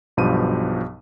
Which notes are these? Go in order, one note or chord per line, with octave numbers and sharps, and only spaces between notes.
B1 G2 B2 F3 G4 D#7